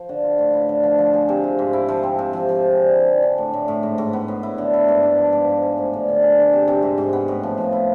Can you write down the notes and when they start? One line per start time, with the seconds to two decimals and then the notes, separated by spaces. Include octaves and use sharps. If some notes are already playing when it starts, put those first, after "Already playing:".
Already playing: F3
0.09 D3
0.24 F4
0.39 A2
0.54 E4
0.69 D3
0.83 F3
0.98 F3
1.13 G#4
1.29 C3
1.44 F4
1.59 G#2
1.73 E4
1.89 F3
2.03 C4
2.19 C3
2.33 F3
2.49 F3
2.63 G#4
2.78 D3
2.94 E4
3.09 D3
3.23 D4
3.38 A2
3.53 A2
3.68 A2
3.83 G#2
3.98 G#2
4.13 B3
4.28 A2
4.43 E4
4.58 D3
4.74 E4
4.88 G#2
5.03 D4
5.18 F3
5.33 G#2
5.48 G#2
5.62 G#4
5.78 A2
5.93 D3
6.09 D3
6.23 G#4
6.38 D3
6.53 C3
6.68 C3
6.82 G#2
6.98 G#2
7.13 B3
7.28 A2
7.43 F3
7.58 F3
7.72 E4